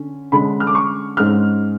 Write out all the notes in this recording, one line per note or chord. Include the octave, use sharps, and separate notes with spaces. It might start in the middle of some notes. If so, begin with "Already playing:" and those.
Already playing: D3 C#4
D3 G#3 C#4 B5
F6
D6
C#6
G#2 G#3 C#4 F6